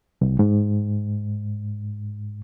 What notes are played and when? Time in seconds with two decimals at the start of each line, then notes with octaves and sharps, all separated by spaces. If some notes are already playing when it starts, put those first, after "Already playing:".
0.21 C2
0.39 G#2